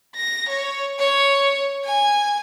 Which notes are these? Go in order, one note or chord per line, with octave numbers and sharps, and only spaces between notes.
A#6
C#5
C#5
G#5